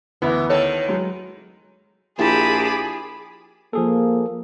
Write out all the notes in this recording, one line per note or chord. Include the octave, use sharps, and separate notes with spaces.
D2 E3 B3 E4
D#3 A4 C#5
F#3 G#3
A#1 E4 G4 G#4 C5 A5 B5 D6
F3 A#3 G#4 A4